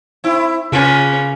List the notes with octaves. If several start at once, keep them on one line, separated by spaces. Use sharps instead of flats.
C4 E4
C#3 A#3 C#4 F4 B4